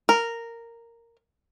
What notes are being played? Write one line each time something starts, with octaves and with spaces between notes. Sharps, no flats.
A#4